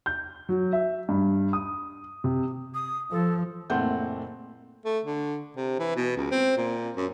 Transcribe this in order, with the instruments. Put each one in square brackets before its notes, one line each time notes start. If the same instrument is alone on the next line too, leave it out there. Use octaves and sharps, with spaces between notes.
[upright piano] G6
F#3
E5
G2
D#6
C3
[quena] D#6
[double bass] F3 [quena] A4
[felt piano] F#1 A#2 A3 C4 F#5 G6
[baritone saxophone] A3
D3
C3
E3
B2
C#2
C4
A#2
F#2